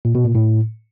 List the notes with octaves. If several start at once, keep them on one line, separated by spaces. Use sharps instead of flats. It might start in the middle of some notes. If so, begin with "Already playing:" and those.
A#2
B2
A#2
A2